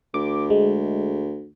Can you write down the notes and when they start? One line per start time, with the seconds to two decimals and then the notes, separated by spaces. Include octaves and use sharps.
0.14 D2 D6
0.50 G#3